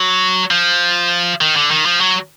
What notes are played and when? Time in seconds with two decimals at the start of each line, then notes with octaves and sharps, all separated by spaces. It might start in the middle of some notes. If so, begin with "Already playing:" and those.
Already playing: F#3
0.51 F3
1.41 D#3
1.56 D3
1.71 D#3
1.86 F3
2.01 F#3